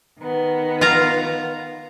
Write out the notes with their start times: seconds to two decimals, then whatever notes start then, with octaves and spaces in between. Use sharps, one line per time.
0.20 D#3 B3
0.81 F4 F5 A#5